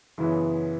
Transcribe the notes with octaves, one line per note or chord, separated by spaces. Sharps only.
F#2 C#3 E3 B3 E4